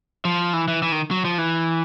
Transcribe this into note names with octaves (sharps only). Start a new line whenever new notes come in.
F3
E3
E3
E3
D#3
F#3
F3
E3